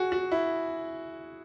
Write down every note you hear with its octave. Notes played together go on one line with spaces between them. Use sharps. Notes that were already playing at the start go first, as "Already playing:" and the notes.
Already playing: F#4 G#4
F#4
E4